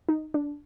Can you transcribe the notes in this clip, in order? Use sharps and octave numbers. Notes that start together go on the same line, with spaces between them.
D#4
D4